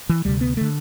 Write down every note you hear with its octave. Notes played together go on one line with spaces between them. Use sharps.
E3
D2 C3 G3
B3
D3 A3